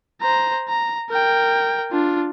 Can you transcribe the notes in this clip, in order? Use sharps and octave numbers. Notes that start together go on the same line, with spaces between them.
C5 A#5
A#5
A#4 G5
D4 F4